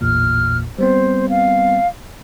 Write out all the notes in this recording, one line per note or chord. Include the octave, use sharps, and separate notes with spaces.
A1 E2 A#2 F6
G3 B3 C4 C5
F5